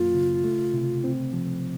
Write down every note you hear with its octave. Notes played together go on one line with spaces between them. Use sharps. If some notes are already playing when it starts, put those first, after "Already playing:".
Already playing: F#2 F#3 A#3 F4
C#3
A3
C3
C4
F3